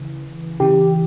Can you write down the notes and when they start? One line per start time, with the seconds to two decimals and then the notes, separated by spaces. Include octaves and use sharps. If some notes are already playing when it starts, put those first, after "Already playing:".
Already playing: C#3 E3
0.60 C#3 E3 G4